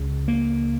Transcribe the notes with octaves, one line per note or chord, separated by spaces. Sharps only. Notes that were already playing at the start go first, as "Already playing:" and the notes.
Already playing: C#2 C#3
A#3